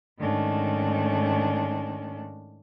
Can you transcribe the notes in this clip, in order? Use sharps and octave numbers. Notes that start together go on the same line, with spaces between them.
G#2 D#3 A3 C#4 D4